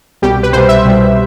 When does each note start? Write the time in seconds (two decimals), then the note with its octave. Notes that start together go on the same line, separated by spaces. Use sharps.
0.22 C2 B2 G3 G4
0.43 B4
0.53 C2 B2 G3 C5
0.69 E5
0.85 C2 B2 G3